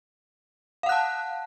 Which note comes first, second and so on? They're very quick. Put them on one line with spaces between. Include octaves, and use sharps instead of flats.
F5 F#5 F#6 A5